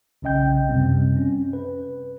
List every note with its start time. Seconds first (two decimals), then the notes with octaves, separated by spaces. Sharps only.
0.22 B1 C#3 C#4 D#5 G5 G6
0.69 F#2 C3 G3 C4
1.17 C#4
1.53 B4